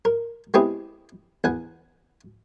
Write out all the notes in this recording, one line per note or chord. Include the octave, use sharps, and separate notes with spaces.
A#4
G#3 B3 C4 E4 G4 G#4
E2 F#5 G#5